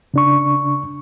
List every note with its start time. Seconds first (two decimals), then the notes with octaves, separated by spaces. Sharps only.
0.14 C#3 D4 C#6